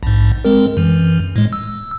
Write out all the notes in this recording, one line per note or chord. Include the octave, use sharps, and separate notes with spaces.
A#1 G#2
G#3 C4 A#4
F#2 E3
A2 G#3
E6